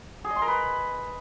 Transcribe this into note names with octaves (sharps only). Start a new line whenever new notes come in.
G#4
D#5
C6
A#4
B4